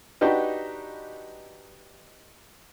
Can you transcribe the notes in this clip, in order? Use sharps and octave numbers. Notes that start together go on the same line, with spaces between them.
D4 D#4 F#4 G4 B4